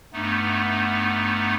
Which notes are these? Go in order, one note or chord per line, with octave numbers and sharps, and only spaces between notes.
G2 A3 B3 D#4